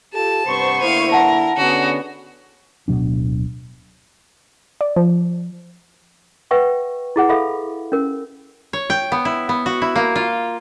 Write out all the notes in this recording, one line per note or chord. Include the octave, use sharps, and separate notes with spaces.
F4 G4 A4 A5
G2 C3 B3 C5 C#6
D3 A#3 E4 F5 D#7
A#4 F#5 A5
D3 B3 C#4 F#4 G#4
D1 B2 F#3 D4
D5
F3
B4 E5 F#5 G5 C#6
E4 G#4 F#5
A4 E5 F5 B5
C#4 A#4
C#5
G5
B3
E4
B3
F#4
E4
A#3
F4